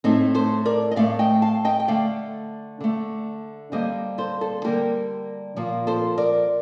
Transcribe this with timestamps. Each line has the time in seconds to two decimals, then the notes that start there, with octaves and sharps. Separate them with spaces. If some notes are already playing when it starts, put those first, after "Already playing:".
0.04 A2 A3 C4 D#4
0.35 A4 C5
0.65 A#4 D5
0.91 D#5
0.96 A2 A3 D5 F5
1.19 D#5 G5
1.42 F5 A5
1.65 D#5 G5
1.80 G5
1.88 D3 A3 D5 F5
2.81 D3 A3
3.72 D3 G3 A#3 C5 D#5
4.18 A4 C5
4.41 A4 C5
4.64 D3 G3 A#3 G4 A#4
5.56 A#2 F3 A#3
5.87 A4 C5
6.18 A#4 D5